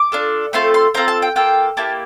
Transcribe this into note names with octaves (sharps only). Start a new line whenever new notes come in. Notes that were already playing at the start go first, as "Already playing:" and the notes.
Already playing: D6
D4 F4 A4
A3 C4 F4 A4 C6
C6
C4 F4 A4 A#5
A5
G5
A#3 F4 A4 G5
A#3 E4 G4 A5